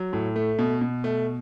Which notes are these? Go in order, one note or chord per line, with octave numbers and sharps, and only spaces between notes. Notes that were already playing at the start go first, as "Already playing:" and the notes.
Already playing: F#3
A2
A3
B2
B2
A3